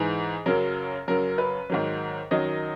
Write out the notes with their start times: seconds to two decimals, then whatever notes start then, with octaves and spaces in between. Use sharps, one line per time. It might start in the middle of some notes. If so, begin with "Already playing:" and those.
Already playing: G#2 E3 G#4
0.46 F#2 C#3 F#3 A#4
1.08 F#2 C#3 F#3 A#4
1.38 B4
1.70 G#2 D#3 F#3
2.31 F#2 D#3 F#3 D#5